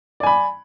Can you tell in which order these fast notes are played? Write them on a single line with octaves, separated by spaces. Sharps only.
D5 G#5 B5